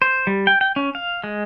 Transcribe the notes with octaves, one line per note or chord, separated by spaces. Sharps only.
C5
G3
G5
G5
C#4
F5
G#3